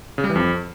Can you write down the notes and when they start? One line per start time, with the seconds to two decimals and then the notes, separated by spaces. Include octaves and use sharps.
0.18 C#3
0.24 G3
0.30 E3
0.36 F2